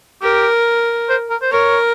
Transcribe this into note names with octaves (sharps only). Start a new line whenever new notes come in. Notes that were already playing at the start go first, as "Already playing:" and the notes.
G4 A#4
C5
A#4
C5
A#4 C#5